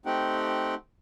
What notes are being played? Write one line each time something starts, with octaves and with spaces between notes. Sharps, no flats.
A3 C4 D#4 G4 F#5 G5